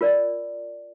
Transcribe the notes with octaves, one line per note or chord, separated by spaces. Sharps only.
F4 A#4 D5